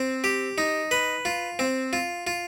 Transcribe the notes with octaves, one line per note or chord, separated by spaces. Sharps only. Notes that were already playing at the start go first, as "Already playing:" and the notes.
Already playing: C4
G4
D#4
B4
F4
C4
F4
F4